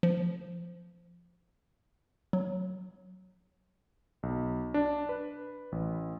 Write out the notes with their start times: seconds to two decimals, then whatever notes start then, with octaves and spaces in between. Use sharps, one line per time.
0.03 F3
2.33 F#3
4.23 B1
4.74 D4
5.09 B4
5.72 A1